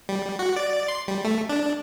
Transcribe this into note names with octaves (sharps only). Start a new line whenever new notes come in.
G3
F#4
D5
C6
G3
A3
D4